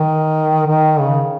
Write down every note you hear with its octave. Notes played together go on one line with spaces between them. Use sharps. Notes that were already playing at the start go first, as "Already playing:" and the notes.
Already playing: D#3
D#3
C#3